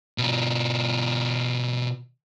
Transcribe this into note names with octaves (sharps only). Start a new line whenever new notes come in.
B2 F4